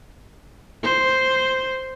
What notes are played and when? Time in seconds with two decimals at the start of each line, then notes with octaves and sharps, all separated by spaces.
0.84 C5